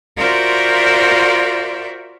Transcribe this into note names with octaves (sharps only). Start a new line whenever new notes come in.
F4 F#4 A#4 C5 D5 E5